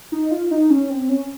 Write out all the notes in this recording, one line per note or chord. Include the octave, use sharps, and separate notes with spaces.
D#4
F4
D#4
C#4
C4
C#4